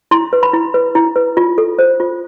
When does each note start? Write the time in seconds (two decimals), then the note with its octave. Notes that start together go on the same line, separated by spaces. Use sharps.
0.11 E4 C6
0.33 B4
0.43 B5
0.53 E4
0.74 B4
0.95 E4
1.16 B4
1.37 F4
1.58 A4
1.79 C5
2.00 F4